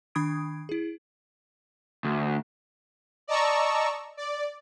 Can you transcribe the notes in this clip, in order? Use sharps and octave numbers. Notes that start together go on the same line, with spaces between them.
D#3 D4 B5 D#6 G#6 D7
E4 G#4
D2
D5 D#5 A5 A#5 C#6 E6
D5